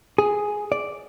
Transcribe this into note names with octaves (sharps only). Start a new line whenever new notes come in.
G#4
D5